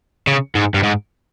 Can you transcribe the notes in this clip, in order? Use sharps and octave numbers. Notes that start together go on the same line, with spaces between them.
C#3
G#2
G2
G#2